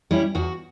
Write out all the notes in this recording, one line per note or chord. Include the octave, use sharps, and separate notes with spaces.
G3 C#4 E4
E2 F#4